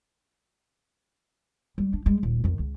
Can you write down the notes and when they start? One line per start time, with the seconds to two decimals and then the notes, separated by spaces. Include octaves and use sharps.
1.78 G3 G#3
1.93 D4
2.06 G3 G#3
2.23 D#1
2.44 F2 D#3
2.59 C#2